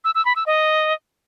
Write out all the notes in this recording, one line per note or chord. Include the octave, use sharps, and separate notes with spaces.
E6
E6
B5
E6
D#5